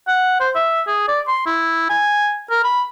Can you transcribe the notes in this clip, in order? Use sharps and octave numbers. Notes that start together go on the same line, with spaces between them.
F#5
C5
E5
G#4
D5
C6
E4
G#5
A#4
B5